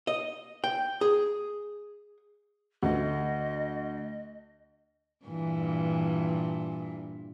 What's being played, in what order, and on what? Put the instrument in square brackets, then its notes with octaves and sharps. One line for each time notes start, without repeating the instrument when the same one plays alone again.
[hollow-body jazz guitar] D#5
G5
G#4
[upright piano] D2 [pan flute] D#5
[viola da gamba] G2 A#2 E3